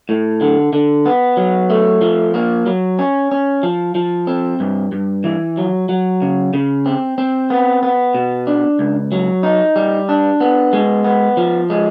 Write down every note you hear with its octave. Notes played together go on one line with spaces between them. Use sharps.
A2
D3
D3
B3
F#3
A3
F3
A#3
F#3
C#4
C#4
F3
F3
C4
G2
G2
E3
F#3
F#3
C#3
C#3
C4
C4
B3
B3
B2
D4
C#2
F#3
D#4
G3
D4
B3
G#3
B3
F3
G#3